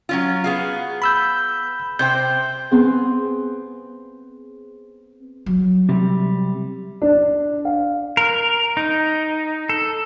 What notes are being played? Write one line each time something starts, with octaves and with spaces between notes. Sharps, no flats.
F#3 C#4 F4
B3 G#4 F5
B5 E6 G6
C3 C5 G5 G6
B3 C4 G#4
F#3
C3 G3
D4
F5
A#4
D#4
A4